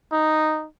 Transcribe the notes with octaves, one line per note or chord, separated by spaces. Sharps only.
D#4